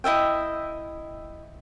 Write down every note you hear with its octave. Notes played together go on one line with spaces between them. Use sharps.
E4 D#5 E5 G5